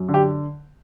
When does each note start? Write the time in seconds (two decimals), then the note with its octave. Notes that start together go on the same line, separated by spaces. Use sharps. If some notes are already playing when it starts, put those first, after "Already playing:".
Already playing: F#2
0.08 D3
0.14 G4